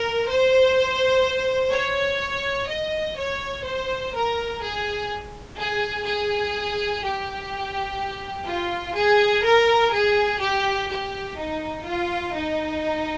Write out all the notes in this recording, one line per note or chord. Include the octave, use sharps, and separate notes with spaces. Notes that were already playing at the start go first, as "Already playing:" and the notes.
Already playing: A#4
C5
C#5
D#5
C#5
C5
A#4
G#4
G#4
G#4
G4
F4
G#4
A#4
G#4
G4
G4
D#4
F4
D#4